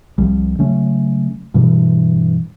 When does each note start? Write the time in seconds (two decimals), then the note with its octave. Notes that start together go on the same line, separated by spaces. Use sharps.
0.18 C2 F3 G3
0.59 C#3 F#3 A3 C#4
1.54 G2 B2 E3